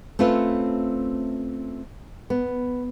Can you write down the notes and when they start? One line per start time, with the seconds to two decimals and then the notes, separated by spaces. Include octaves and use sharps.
0.19 A3 C4 C#4 F4 B4 E5
2.30 B3